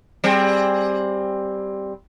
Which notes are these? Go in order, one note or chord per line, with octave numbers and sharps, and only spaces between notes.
G3 C4 G#4